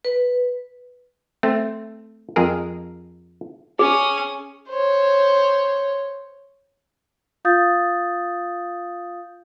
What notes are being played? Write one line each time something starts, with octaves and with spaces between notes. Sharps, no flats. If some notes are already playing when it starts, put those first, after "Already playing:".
B4
A3 C4
F2 G#3 G#4 A#4
C#4 G#4 D#6
C5 C#5
F4 F5 D#6 G6 A6